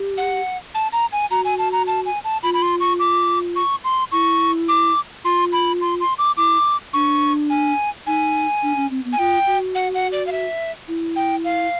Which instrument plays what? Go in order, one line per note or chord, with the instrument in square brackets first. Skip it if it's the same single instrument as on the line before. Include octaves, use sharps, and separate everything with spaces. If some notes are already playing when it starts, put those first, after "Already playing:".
Already playing: [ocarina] G4
[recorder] F#5
A5
A#5
G#5
[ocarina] F#4 [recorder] A#5
[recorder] G#5
A5
A#5
A5
G#5
A5
[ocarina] F4 [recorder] B5
[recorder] B5
C6
C#6
D6
C#6
C6
[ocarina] E4 [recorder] C#6
[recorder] D6
[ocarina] F4 [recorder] C6
[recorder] B5
C6
C6
D6
[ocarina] E4 [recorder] D6
[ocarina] D4 [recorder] C#6
[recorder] G#5
[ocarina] D#4 [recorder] G#5
[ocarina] D4
C#4
C4
B3
[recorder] G#5
[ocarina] F4 [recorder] G5
[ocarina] F#4
[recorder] F#5
F#5
D5
F5
E5
[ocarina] E4
[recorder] G5
F5